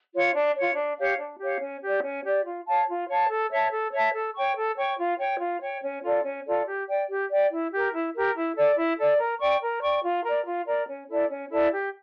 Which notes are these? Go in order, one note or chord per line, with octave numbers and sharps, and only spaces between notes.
F4 C#5
D4
F4 C#5
D4
G4 C#5 F5
D4
G4 C#5 F5
C#4
G4 D5
C#4
G4 D5
F4
C#5 F5 A5
F4
C#5 F5 A5
A4
C#5 E5 A5
A4
C#5 E5 A5
A4
C#5 G5 C#6
A4
C#5 G5 C#6
F4
C#5 G5
F4
C#5 G5
C#4
F4 A4 D5
C#4
F4 A4 D5
G4
D5 G5
G4
D5 G5
E4
G4 A#4
E4
G4 A#4
E4
A4 D5
E4
A4 D5
A#4
D5 G5 C#6
A#4
D5 G5 C#6
F4
A#4 D5
F4
A#4 D5
C#4
E4 A4 D5
C#4
E4 A4 D5
G4